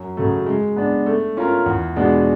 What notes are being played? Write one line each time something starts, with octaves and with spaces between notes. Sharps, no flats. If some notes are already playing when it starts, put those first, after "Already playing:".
Already playing: F#2
C#3 F#3 A3
G#3
B3 D4
A3
C#4 F4 A#4
E2
B2 G#3 B3 D4